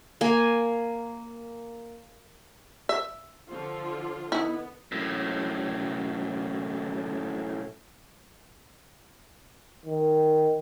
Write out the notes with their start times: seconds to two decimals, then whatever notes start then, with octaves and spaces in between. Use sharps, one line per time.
0.21 A#3 G#5
2.89 E5
3.47 D3 F3 F4
4.32 B3 D#4 E4
4.92 F#2 A2
9.86 D#3